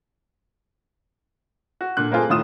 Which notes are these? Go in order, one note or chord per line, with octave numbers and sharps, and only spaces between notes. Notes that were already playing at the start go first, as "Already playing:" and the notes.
F#4
A#2 D3 F#6
A3 A#3 C4 F4 G#4
D#1 A2 D#3 F4 D#6 E7